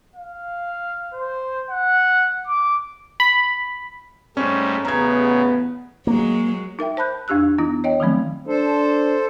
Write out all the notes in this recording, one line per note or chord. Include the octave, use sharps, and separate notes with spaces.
F5
C5
F#5
D6
B5
G#2 G3 A3 C#4
A1 E2 C#3 B3 A#5 G#6
F#3 G#3 A#3
D#4 A#4 E5 G5
C5 A5 B5 F#6 G6
F2 D4 G4 E6 F#6
E3 B3 D#4 E4
C#5 D#5 G5
D#3 F3 F#3 A3 C4
D4 A4 C5